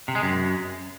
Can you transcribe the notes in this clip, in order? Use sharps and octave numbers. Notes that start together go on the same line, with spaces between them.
C3
G#3
F#2